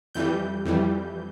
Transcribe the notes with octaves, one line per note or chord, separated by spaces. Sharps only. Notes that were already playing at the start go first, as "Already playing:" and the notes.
F2 E3 G3 G6
F2 E3 G3